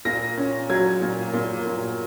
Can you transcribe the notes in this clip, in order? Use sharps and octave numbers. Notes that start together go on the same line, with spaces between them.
A#2 A#6
C#4
F#3 G#6
A#2
A#2
A#2